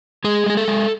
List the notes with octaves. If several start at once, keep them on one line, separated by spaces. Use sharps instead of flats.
G#3 G#4
G#3 G#4
A4
G#3